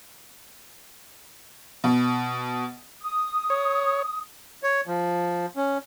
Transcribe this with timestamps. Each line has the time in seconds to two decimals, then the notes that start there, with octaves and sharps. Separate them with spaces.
1.84 B2
3.02 D#6
3.50 C#5
4.63 C#5
4.87 F3
5.56 C#4